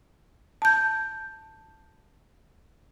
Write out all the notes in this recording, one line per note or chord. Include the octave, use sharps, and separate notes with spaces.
A5 G6